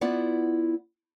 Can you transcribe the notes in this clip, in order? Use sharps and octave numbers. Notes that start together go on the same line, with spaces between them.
B3 E4 F4 D5 F#5